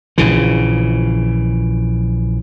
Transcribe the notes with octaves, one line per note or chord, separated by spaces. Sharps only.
A#1 C#3 E3